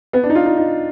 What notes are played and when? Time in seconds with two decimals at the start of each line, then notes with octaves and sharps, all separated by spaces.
0.13 B3
0.23 D4
0.30 D#4
0.35 F4
0.46 D#4
0.57 D#4